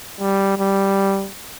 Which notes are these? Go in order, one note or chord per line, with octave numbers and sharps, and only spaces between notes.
G3
G3